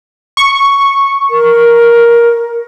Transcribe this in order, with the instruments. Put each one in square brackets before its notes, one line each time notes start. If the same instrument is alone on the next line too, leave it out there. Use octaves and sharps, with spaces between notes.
[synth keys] C#6
[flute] A#4